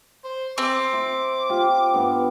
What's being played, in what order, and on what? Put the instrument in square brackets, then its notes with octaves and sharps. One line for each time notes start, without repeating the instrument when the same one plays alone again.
[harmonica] C5
[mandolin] C4 [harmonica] D6
[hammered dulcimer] E5 C6
F4 G4
G2 B3